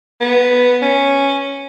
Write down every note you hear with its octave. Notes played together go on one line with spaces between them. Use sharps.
B3
C#4